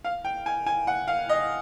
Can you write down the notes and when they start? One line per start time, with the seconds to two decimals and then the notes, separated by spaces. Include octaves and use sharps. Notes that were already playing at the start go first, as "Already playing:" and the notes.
0.05 F5
0.25 G5
0.46 G#5
0.66 G#5
0.87 F#5
1.08 F5
1.29 D#5